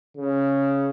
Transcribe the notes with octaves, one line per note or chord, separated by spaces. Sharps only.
C#3